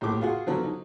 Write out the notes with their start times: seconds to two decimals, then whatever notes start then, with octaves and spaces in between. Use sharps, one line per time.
0.01 A#1 A2 G4 D6
0.21 F4 F#4 G#4 F#5
0.47 D3 F3 F#3 B3
0.64 D#4